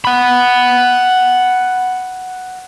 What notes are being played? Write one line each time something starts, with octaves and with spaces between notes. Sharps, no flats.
F#5 B5